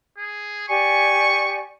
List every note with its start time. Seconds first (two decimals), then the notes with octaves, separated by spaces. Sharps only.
0.18 G#4
0.69 G4 D5 G#5 C#6